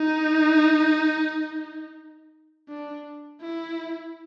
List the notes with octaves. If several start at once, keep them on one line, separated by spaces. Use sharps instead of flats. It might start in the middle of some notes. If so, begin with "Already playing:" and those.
Already playing: D#4
D4
E4